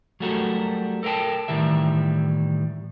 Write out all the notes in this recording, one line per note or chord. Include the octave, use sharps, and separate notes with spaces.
F#3 G3 A3 F#4 A4 A#4
A4 A#4 D#5 G5 A5
A2 D#3 E3 G3 E5